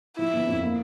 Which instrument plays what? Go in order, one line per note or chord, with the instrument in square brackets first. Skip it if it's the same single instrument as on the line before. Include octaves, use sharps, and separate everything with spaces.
[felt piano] F3 [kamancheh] E4
[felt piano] G1
F2
A#3